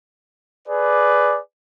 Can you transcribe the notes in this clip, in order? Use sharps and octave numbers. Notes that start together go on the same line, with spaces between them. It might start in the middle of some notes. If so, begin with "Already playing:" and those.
G#4 B4 D5